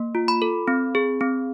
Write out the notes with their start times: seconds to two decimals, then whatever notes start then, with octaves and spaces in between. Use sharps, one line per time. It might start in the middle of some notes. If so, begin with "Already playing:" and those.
Already playing: A#3
0.15 F4
0.28 B5
0.42 A4
0.68 C4
0.95 G#4
1.21 C4